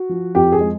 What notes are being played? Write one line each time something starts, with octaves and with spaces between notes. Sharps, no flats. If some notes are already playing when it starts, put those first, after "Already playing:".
Already playing: F#4
F3
F2 G4
G#4
G#3